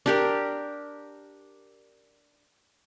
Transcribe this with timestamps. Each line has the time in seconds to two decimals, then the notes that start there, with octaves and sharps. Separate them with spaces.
0.06 D4 G4 A#4